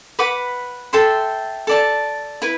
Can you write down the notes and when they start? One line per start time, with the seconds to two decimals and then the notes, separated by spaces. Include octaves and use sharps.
0.19 B4 F#5 B5 D6
0.93 A4 E5 G5 C6
1.67 A4 D5 A5
2.42 E4 B4